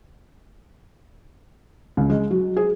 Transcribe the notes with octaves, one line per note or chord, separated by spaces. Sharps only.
C#2
G#3
F#3
G#4